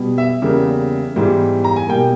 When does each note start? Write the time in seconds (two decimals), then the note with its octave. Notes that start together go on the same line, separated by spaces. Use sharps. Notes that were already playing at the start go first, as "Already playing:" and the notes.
Already playing: B2 G3 B3
0.18 E5
0.42 E2 C#3 G3 A#3
1.16 G#2 E3 G3 B3
1.64 A#5
1.76 G#5
1.89 B2 G3 A#3 G5